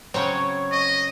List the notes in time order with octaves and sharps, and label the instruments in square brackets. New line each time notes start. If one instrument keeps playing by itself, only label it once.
[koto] C#3 F#3 C4 [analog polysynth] C#5
[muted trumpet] D#5